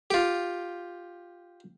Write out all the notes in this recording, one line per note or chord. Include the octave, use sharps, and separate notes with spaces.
F4 G4